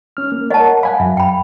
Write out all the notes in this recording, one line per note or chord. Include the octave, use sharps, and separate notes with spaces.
C#4 F6
A#3
A#4 C#5 D#5 F#5 A5
F5 F#5 G#5 B5
F#2 E5
G5 B5